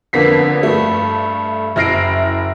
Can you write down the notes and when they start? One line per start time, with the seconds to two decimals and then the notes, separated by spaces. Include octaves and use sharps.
0.13 F2 D3 A#3 B3 B6 C7
0.63 G2 A3
1.76 F#1 E4 F6 A#6 C7 D7